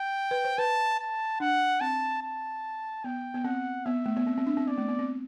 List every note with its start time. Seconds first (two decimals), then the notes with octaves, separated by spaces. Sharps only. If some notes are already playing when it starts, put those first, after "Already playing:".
Already playing: G5
0.31 B4
0.45 C5
0.58 B4 A5
0.99 A5
1.40 D4 F#5
1.81 C4 A5
2.22 A5
3.04 B3 G5
3.34 B3
3.44 C4 F#5
3.85 B3 E5
4.06 A3
4.17 B3
4.27 C4
4.37 C4
4.46 D4
4.57 C4
4.67 B3 D5
4.78 A3
4.88 B3
4.99 C4